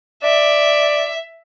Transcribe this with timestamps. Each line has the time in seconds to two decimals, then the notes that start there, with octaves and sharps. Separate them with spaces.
0.23 D5 E5